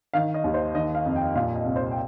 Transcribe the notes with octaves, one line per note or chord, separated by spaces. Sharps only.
D#3 F5
D#5
D#2
C5
D#3 D#5
F5
F2
G5
A#2 F5
D#5
C2
C5
G5